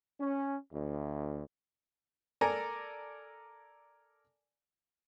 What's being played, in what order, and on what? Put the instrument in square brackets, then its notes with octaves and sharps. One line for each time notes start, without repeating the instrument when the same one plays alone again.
[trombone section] C#4
D2
[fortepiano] A4 A#4 D5 G#5 A#5